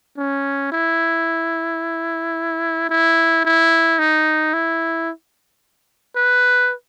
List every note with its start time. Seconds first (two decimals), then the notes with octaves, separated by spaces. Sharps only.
0.17 C#4
0.72 E4
2.90 E4
3.45 E4
3.99 D#4
4.54 E4
6.16 B4